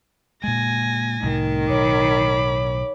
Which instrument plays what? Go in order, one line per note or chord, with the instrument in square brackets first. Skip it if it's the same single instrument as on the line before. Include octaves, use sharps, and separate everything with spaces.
[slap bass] A#2 G#3 [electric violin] G#5 A#6
[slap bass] C2 A2 C3 [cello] D#3
[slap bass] B1 A2 [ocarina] C#5 [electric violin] B5 D6